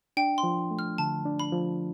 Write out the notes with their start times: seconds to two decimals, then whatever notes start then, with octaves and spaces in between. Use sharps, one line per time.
0.17 D4 G5
0.38 C6
0.43 F3
0.71 A3
0.79 F6
0.98 D3 A5
1.25 D4
1.40 B5
1.52 F3